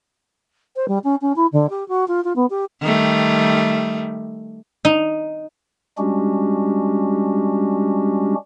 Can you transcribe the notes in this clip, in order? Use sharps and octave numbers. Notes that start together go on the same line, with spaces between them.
C5
G3
C#4
C#4
E4
D3
G4
F#4
F4
F4
B3
G4
D#3 G3 A3
D#4
G3 G#3 C#4 D4 F#4 G4